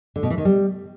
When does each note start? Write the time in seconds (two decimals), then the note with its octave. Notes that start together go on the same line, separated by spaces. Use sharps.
0.16 D3
0.23 B2
0.30 E3
0.38 D#3
0.45 G3